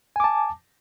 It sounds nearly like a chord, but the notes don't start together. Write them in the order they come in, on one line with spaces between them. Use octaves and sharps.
G#5 D6 A5